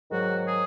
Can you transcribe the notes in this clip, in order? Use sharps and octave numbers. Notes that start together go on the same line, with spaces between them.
G#2 D#3 F#3 F#4
G#4